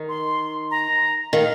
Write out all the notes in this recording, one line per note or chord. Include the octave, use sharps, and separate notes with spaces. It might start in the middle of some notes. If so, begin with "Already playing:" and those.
Already playing: D#3
C6
A#5
D#3 F5